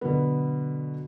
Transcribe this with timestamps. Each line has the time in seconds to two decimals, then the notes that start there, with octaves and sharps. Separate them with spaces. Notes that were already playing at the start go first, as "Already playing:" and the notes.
0.01 B2 D3 F#3 B3